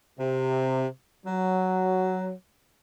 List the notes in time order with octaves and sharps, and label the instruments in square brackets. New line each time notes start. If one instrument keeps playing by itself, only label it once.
[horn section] C3
F#3